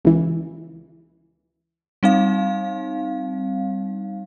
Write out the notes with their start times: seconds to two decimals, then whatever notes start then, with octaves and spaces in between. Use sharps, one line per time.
0.05 C#2 E3
2.03 G3 C4 D#4 F5